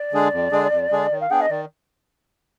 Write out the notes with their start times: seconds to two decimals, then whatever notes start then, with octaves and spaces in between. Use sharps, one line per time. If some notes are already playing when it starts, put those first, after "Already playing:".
Already playing: D5
0.12 D3 G#3 D4 G#4
0.33 F2
0.52 D3 G#3 D4 G#4
0.71 F2
0.91 D3 G#3 D4 G#4
1.11 D#3
1.21 F5
1.30 B3 D4 G#4 G5
1.40 D#5
1.50 D#3 D5